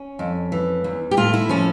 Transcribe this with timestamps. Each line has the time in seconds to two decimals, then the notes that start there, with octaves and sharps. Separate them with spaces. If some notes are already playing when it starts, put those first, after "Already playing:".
Already playing: C#4
0.19 F2
0.52 E3
0.84 E2
1.11 G4
1.17 A2 F4
1.34 E4
1.49 F3 C#4